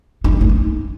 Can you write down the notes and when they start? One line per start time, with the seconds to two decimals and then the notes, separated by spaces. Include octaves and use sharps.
0.24 D#4
0.33 B3
0.41 D#4
0.49 A#3